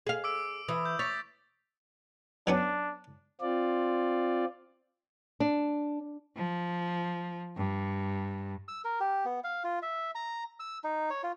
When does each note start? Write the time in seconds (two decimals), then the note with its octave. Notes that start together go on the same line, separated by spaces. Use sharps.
0.07 G#4 F5
0.24 D6 E6 D7
0.68 E3 D#6
0.85 G6
0.99 C#5 A6 B6
2.47 F#3 B3 C#4 D4
3.41 C4 F4 D5
5.40 D4
6.36 F3
7.56 G2
8.68 E6
8.84 A#4
9.00 G4
9.25 B3
9.44 F5
9.64 F4
9.82 E5
10.15 A#5
10.60 E6
10.84 D#4
11.10 C#5
11.23 F4